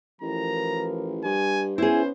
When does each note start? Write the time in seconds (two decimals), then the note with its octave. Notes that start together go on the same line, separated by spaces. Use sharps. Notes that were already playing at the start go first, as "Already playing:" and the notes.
0.22 A1 E3 F3 A#4 A#5
1.24 G2 G#5
1.78 B3 C#4 E4 G#4 C5